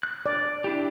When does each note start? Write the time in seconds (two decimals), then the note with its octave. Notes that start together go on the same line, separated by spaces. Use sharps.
0.03 F#6
0.26 D5
0.64 D4 E4 G4